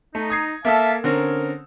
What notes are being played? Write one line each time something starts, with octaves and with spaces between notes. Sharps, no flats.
A3 D#4
D#6 G#6 C7
A#3 A4 E5 F5 A5 E6
D3 C4 C#4 A#4